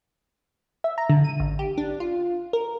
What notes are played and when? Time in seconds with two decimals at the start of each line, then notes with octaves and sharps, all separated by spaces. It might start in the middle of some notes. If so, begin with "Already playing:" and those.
0.84 E5
0.98 A#5
1.10 D3
1.24 D#7
1.40 A1
1.59 G4
1.78 D4
2.00 F4
2.53 A#4